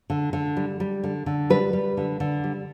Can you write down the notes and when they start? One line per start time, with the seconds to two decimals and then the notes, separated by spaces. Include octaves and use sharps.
0.10 D3
0.33 D3
0.57 G3
0.80 G3
1.04 D3
1.26 D3
1.50 G3 B4
1.73 G3
1.97 D3
2.20 D3
2.44 G3